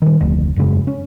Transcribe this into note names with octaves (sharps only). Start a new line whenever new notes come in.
D#3 G3
F1 D2
E1 F#2 C#3 G#3
C#4